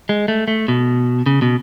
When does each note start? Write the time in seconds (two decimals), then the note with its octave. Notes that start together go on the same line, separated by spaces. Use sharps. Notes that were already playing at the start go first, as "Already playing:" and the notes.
0.09 G#3
0.28 A3
0.48 A3
0.68 B2
1.26 C#3
1.42 B2